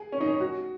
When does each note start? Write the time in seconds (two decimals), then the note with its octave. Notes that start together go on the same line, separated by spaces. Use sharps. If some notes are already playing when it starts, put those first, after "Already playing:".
Already playing: G#4
0.12 C#4
0.20 D#4
0.28 C#4
0.40 F#4